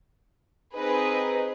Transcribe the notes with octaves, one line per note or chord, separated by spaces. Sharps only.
C4 D#4 G#4 B4 D#5